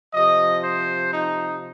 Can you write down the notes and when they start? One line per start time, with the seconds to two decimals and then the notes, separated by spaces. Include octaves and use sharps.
0.14 C3 F3 D#5
0.64 C5
1.14 D#4